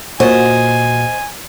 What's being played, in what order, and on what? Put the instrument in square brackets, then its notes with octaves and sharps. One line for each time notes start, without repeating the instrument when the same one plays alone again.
[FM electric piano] A#2 F#4 [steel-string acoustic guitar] C5 D#5 [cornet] G#5